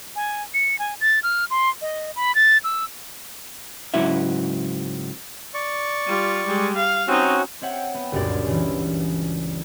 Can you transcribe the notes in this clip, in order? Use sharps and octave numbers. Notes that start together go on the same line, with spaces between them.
G#5
C#7
G#5
A6
F6
C6
D#5
B5
A6
E6
C#2 G#2 F#3 C#4 E4 E5
D5 C#6
G3 F4
G3 G#3
F5
C4 C#4 D#4 F#4
C4 C#5 E5 F#5 G5
B3
G1 C#2 F#2 A#2 D5
C#3 E3